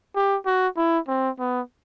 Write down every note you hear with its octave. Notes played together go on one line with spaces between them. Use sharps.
G4
F#4
E4
C4
B3